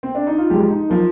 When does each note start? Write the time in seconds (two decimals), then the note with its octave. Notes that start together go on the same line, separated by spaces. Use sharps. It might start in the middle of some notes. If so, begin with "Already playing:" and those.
0.03 C4
0.15 D4
0.27 D#4
0.38 F4
0.50 G#2 F3 G#3 G4
0.69 D#4
0.89 F3 A#3